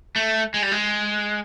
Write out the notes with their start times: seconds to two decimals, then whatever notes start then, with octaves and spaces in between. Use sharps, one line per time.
0.16 A3
0.54 G#3
0.62 G3
0.72 G#3